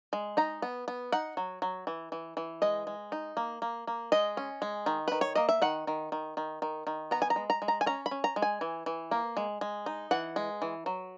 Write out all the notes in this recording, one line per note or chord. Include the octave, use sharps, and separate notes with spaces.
G#3
D#4 A#5
B3
B3
D#4 F#5
F#3
F#3
E3
E3
E3
G#3 D#5
G#3
D#4
A#3
A#3
A#3
G#3 D#5
C#4
G#3
D#3
D#3 B4
C#5
A#3 D#5
E5
D#3 F#5
D#3
D#3
D#3
D#3
D#3
B3 A#5
G#5
A#5
G#3
A#5
G#3
A#5
G#5
C#4 A#5
B5
C#4
A#5
G#3
G#5
E3
E3
A#3
G#3
G#3
D#4
E3 F#5
G#3
E3
F#3